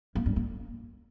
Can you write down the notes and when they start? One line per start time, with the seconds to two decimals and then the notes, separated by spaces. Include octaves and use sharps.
0.15 A#3
0.26 G2
0.36 A#3